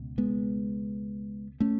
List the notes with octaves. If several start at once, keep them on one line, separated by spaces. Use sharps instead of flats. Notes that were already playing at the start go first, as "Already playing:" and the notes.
Already playing: C#2 B2
G#3 B3
A3 C#4